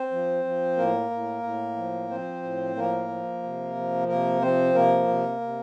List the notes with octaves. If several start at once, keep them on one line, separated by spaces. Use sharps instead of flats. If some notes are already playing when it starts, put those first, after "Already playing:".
Already playing: C4 C5
F3
F3
A2 A#3 A#4
A2
A2
F3
F3 C4 C5
A2
F3 A#3 A#4
F3
C3
F3
C3 A#3 A#4
F3 C4 C5
C3 A#3 A#4
C3
C3